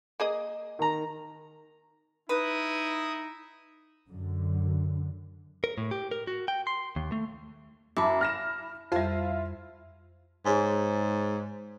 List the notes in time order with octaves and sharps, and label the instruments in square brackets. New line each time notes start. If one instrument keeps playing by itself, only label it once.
[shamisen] A#3 G#4 D#5
[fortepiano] D#3 A#5
[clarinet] D#4 [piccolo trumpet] E4 [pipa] B4 [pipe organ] D#6
[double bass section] F#2 D3
[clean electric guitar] A#4
A2
G4
A#4
F#4
G5
C6
D#2
A3
[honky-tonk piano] F#2 [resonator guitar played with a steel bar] E4 [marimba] A5 D6
[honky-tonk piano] F6 A#6 E7
[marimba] F2 G3 [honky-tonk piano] E4 F4 [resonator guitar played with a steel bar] C5
[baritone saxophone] G#2 [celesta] G#4 C#5 G#5